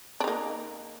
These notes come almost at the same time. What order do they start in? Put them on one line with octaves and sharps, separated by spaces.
D4 D#4 A#3